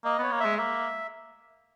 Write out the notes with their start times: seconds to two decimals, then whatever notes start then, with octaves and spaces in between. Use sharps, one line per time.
0.04 A#3 D#5
0.19 B3 C#5
0.32 A#3
0.40 G#3 E5
0.58 A#3 E5